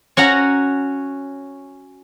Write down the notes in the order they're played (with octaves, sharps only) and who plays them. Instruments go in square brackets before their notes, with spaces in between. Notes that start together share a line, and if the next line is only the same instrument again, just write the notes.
[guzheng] C#4 F#4 F#5 A#5